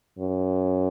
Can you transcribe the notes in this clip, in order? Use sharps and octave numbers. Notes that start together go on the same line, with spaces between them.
F#2